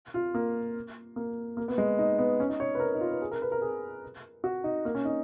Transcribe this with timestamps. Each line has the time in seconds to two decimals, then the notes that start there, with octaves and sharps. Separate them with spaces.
0.14 F4
0.34 A#3
1.16 A#3
1.57 A#3
1.68 B3
1.78 G#3
1.99 D#4
2.18 B3
2.40 C#4
2.49 D#4
2.60 C#5
2.75 B4
2.80 A#4
2.94 D#4
3.00 F4
3.11 B4
3.21 G#4
3.31 A#4
3.42 B4
3.52 A#4
3.62 G#4
4.44 F#4
4.64 D#4
4.85 A#3
4.95 C#4
5.05 D#4